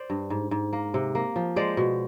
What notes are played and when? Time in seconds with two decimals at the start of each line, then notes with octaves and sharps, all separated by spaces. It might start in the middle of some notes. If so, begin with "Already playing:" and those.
Already playing: C5 D5
0.10 G2
0.30 G#2
0.51 G#2
0.73 A#3
0.94 C3
1.15 A#3
1.36 F3
1.56 G#3 C5 D5
1.77 B2